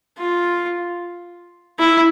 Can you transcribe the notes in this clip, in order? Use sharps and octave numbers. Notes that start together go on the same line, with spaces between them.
F4
E4